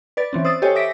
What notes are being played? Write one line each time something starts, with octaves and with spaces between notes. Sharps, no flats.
B4 D5 A6
E3 C4 C#4
C5 D#6 E6 A6
G4 A4 C5 C#5 D#5 G#5
E5 D6 E6 A#6 B6 D7